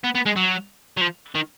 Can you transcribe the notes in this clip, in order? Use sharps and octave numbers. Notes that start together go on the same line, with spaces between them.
B3
B3
G#3
F#3
F#3
F3
D#3